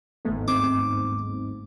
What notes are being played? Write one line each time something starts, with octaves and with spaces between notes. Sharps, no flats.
G1 D#2 G#2 A3 B3
C4 D6